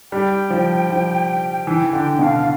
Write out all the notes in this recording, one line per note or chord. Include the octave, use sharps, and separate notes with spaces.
G3 G5
F3
F3
E3 G5
D3 G5
B2 G5
F5